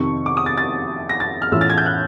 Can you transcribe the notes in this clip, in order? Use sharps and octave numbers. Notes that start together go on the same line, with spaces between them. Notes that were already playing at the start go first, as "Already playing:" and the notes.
Already playing: F2 C3 D#3 C#6
D6
D#6
A6
A6
A#6
A6
F6
A2 E3 A3 C#4 F4 E6
A6
G#6
G6
F#6